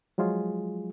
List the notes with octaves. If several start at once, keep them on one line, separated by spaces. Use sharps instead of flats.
F3 F#3 G#3 F4 G#4